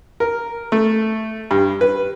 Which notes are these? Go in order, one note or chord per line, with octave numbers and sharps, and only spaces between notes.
A#4
A3
G2
B4